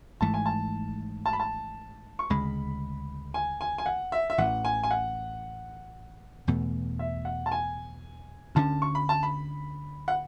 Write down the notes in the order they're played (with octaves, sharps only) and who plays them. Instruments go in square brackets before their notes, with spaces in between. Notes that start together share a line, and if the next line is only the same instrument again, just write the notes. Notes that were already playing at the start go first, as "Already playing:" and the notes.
[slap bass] G#1 G#2 E3 A3 [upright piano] A5
[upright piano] G#5
A5
A5
B5
A5
C#6
[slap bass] D2 C#3 G#3 [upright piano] B5
[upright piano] G#5
G#5
G#5
F#5
E5
E5
[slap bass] A1 A2 E3 [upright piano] F#5
[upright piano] G#5
G#5
F#5
[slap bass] E2 B2 A3
[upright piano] E5
F#5
A5
G#5
[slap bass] D2 D3 G#3 C#4 [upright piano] A5
[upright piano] C#6
B5
A5
B5
F#5